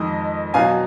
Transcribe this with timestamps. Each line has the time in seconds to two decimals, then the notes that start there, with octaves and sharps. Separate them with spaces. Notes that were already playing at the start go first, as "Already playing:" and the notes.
Already playing: F2 D#3 G#3 D#5
0.54 B2 F#3 F5 G#5